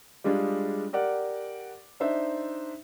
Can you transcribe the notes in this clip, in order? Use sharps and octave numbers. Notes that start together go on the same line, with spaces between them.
G3 G#3 D4 F4 G4 G#4
G4 A#4 D5 F#5
D4 D#4 C5 E5